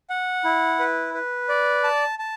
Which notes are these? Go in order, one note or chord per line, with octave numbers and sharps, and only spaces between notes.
F#5
E4
B4
B4
D5
A5
A5